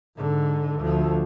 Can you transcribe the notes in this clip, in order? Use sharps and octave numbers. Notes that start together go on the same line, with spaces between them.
G#2 D3
D2 F3